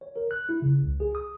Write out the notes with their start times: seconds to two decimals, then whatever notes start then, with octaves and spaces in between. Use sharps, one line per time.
0.01 C#5
0.16 A#4
0.31 F#6
0.49 E4
0.62 C#3
0.82 C#2
1.00 G#4
1.15 D#6